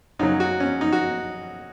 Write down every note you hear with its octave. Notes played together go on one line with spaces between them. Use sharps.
F#2 C#3 F#3 D#4
F#4
C#4
D#4
F#4